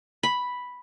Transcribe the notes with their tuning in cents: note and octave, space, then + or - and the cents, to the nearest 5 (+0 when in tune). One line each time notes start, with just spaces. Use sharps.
B5 +0